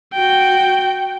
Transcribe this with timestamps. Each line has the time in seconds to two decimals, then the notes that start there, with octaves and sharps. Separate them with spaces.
0.14 F#4 G5